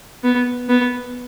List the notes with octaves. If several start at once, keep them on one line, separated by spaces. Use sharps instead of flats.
B3
B3